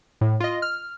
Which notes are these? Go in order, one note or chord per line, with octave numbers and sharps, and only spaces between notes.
A2
F4 D#5
F6